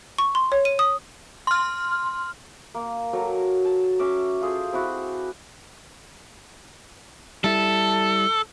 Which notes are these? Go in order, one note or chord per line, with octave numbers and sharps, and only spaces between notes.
C#6
C6
C#5
D#7
D#6
C6 F6
A#3
F#3 A4 A#4
A5
C#4 E5 D6
F4 G#4 A4 C5
C4 E4 F#4
G3 E4 A4